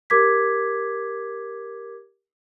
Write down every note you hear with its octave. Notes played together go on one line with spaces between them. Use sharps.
G4 A#4 D6 G#6 B6